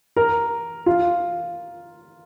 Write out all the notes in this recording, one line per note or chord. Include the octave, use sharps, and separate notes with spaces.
A#4
F4